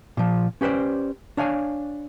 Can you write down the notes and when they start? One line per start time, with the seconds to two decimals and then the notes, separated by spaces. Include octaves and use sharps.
0.17 A#2 F3
0.61 C#4 G4 B4 C5 D5
1.37 D4 C#5 F5 G#5